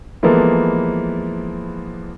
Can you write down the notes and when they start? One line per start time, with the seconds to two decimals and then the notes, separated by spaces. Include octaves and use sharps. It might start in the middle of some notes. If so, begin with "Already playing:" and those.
0.23 E3 F3 G#3 A#3 B3 A4